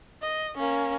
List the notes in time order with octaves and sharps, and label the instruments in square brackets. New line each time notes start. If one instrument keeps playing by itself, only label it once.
[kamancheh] D#5
A#3 C#4